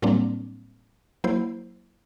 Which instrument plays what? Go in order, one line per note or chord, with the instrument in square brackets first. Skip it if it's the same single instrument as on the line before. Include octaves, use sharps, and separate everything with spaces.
[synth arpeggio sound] A2 F#3 G3 A#3 C4 D4
F#3 A#3 E4 C5